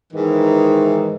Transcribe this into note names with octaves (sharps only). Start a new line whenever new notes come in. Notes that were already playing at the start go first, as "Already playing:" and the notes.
G#2 D#3 E3